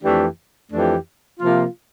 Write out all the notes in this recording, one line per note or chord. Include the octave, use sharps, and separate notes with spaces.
F2 E3 A3 D4 G4
F2 E3 A3 D4 G4
C3 F3 A#3 F4